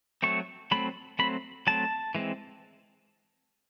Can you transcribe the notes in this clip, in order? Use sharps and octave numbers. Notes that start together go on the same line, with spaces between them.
F#3 A3 C4 C#6
F#3 A3 C4 B5
F#3 A3 C4 B5
F#3 A3 C4 A5
E3 G#3 C4